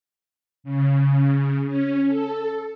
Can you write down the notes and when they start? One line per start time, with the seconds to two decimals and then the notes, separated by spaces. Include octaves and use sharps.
0.64 C#3
1.66 C#4
2.07 A4